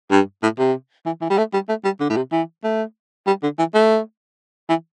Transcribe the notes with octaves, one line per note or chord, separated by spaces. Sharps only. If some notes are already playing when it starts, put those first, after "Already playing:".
G2
A2
C3
E3
E3
G3
A3
G3
A3
G3
D3
A2
C3
E3
A3
G3
D3
E3
A3
E3